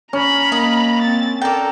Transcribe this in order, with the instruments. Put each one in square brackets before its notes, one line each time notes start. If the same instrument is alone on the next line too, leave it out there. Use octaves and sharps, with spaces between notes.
[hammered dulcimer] C#4 [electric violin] A#5 B5 [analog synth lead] F6
[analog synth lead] A#3 [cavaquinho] D#5
[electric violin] C4 A6
[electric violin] A4 A#4 [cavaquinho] D5 G5 [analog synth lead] A#5